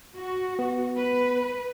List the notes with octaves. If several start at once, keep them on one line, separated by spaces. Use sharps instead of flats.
F#4
B3
B4